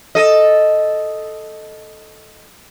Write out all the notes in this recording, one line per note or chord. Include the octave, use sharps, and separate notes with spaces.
A4 D#5